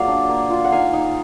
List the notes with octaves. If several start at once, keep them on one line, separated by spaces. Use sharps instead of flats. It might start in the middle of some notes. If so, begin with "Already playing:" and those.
Already playing: F#3 A#3 F4 G#4 D5 F5
D4
A#3
F4
F#5
D#4 F5 G#5
D#4